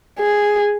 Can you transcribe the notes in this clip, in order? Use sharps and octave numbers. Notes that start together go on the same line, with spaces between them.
G#4